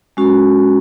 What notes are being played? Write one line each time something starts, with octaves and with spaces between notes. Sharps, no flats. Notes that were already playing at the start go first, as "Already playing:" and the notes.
G#3 C#4 F#4